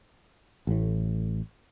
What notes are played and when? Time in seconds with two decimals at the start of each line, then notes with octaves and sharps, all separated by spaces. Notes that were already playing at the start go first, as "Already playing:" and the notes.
0.67 A1 A2